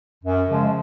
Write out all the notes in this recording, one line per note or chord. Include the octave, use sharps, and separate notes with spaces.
F#2
C#3 F3 G#3